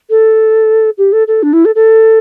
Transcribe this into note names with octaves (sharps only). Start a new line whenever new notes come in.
A4
G4
A4
A4
D4
E4
A4
A4